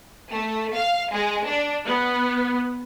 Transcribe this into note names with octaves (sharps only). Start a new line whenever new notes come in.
A3
F5
G#3
D4
B3